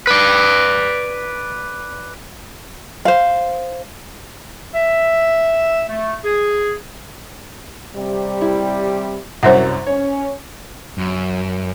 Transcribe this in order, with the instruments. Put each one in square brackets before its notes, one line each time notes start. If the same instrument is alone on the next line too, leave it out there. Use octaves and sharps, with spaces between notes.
[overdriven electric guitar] B4 D5
[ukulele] C5 F5
[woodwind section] E5
A3
G#4
[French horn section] C3 G3
[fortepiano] E4
[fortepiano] C2 F#2 [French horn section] C3 F#3 [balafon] C5 E5 F#5
[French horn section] C#4 [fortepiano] C#5
[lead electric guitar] F#2